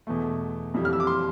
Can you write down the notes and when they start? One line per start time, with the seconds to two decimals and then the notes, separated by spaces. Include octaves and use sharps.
0.07 E2 B2 A3
0.74 F2 E3 G3
0.85 F6
0.93 E6
1.00 D6
1.07 C6